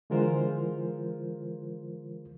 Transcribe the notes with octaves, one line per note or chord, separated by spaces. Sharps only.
D3 E3 G#3 F4 A#4 C5